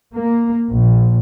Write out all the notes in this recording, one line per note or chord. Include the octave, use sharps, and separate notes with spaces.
A#3
A#1